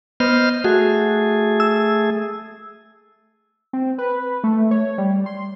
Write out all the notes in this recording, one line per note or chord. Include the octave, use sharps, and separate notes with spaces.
B3 C5 D#5 F6
A3 F#4 G#4
E6
C4
B4
A3
C#5
G3
C6